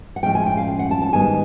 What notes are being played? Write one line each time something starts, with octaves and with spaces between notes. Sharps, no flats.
F#5
A2 F3 G#3 C#4 G5
G#5
G5
F5
F#5
A5
A5
G#2 D#3 G3 B3 G#5